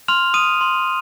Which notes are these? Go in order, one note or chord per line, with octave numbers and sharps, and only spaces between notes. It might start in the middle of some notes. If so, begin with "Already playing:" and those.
C6 F6 F7
D#6 D#7
C6